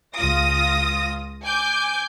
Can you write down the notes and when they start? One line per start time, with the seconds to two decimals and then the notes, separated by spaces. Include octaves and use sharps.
0.15 C#2 F4 D#6 A#6
1.43 G#5 D6 G6